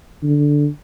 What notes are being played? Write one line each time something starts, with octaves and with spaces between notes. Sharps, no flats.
D3